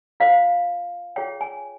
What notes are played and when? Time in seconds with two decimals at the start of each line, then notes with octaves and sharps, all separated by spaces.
0.20 F4 C5 F5
1.16 F4 G#4 C#5 G5
1.41 G#5